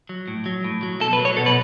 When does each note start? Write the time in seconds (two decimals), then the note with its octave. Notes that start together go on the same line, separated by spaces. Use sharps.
0.09 F#3
0.28 A2
0.46 F#3
0.64 A2
0.83 F#3
1.01 B2 A4
1.13 B4
1.19 F#3
1.25 C#5
1.37 B2 A4
1.46 B4